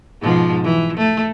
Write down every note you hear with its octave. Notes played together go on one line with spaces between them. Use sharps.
G#2 B2 F3
E3
A3